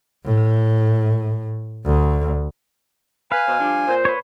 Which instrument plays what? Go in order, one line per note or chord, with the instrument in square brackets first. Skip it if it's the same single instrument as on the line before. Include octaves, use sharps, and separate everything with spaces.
[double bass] A2
D2
[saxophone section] B4 [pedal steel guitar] F5 [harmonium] G#5
[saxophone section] B2 C5
F3 G3 D4
A#2 C5
[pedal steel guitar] B4 C#5